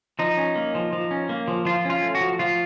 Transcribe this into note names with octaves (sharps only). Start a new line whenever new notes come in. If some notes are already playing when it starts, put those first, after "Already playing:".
F3 D#4
C#4
A#3
F3
F3
C#4
A#3
F3
F3 F4
C#4 F4
A3
F#4
F3
F3 F4